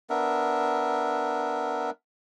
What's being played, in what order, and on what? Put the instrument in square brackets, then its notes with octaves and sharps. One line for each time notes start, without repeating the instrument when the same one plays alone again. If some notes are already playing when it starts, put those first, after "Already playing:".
[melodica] B3 D4 A#4 E5